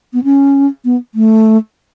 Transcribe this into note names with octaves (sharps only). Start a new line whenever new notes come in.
B3
C#4
B3
A3